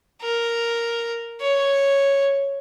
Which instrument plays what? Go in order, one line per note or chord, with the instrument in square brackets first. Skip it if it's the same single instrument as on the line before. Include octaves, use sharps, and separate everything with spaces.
[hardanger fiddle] A#4
C#5